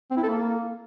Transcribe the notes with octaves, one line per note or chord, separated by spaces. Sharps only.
C4
E4
A4
A#3